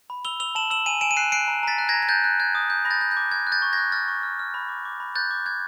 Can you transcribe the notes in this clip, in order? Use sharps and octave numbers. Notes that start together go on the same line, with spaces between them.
B5
E6 F7 G7
E6 F7 G7
A5 E7 F#7
E6 E7 F#7
G#5 D#7 F7
G#5 D7 E7
D#7
F#6 C7 D7
F#6 C7 D7
A#5
A#5 A6 B6
F#6
A#5 G#6 A#6
G#6
F#6 G6 A6
F#6
F#6 G#6
D#6
G6
B5 A#6
G6 A6
G6
G6
D6
F#6 G#6
F#6
G6 A6
C#6
G#6 A#6
F#6
F6 G6 A6
C#6
F6
F6
B5
D6
D6
B5
F#6 G6 A6
D6
F#6 G#6